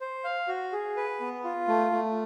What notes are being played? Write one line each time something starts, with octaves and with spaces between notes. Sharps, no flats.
C5
F5
F#4
G#4
B4
B3
F4
A3
A3